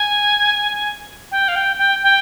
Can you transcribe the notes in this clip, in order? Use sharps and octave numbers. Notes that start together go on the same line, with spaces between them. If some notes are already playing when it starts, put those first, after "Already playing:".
Already playing: G#5
G5
F5
G5
G5
G5